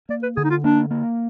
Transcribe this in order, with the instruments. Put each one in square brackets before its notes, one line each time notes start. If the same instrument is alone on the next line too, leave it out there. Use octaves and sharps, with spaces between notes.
[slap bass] A#3 [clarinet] D5
[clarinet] B4
[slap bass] D3 [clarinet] G#4
[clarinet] D#4
F4
[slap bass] A#3 [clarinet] D4
[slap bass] A#3